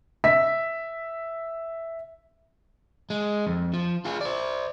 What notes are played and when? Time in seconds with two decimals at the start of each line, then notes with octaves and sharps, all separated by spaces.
0.24 E5 B6
3.10 G#3
3.47 F2
3.74 F3
4.05 F4 G#4
4.21 C5 D5